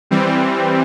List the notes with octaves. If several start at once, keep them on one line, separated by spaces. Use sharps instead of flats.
E3 G3 C4